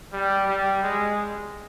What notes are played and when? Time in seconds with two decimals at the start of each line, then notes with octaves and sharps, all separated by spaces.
0.13 G3
0.48 G3
0.83 G#3